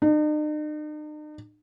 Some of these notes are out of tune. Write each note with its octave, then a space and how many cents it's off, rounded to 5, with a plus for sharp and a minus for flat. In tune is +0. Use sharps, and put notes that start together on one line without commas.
D#4 -45